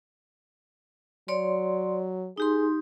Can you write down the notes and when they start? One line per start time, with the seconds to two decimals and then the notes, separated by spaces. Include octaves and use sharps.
1.28 F#3 C#5 D5 C6
2.37 D#4 G4 G#4 C6